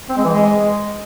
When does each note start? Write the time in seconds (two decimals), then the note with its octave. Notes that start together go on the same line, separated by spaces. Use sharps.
0.09 C4
0.17 G#3
0.25 E3
0.33 G#3